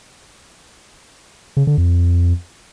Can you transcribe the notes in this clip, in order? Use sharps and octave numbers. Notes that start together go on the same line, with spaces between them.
C#3
D3
F2